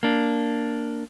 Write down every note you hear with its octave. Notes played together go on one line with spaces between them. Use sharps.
A#3 D4